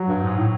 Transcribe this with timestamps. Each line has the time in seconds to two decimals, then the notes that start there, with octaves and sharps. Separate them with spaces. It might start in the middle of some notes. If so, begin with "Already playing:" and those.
Already playing: F#3
0.08 G2
0.23 G#2
0.37 A2